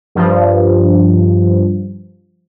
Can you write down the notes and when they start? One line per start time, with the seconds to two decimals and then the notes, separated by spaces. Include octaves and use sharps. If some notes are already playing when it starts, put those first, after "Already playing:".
0.15 G2 F3